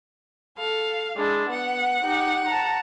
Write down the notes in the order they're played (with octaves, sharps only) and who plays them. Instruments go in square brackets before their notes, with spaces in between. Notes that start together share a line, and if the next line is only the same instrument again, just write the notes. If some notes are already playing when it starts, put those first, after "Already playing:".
[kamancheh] A4 [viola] F5
[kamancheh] G#3 [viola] D4 E4
[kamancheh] B3 [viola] F#5
[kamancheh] D#4 G4
A5 A#5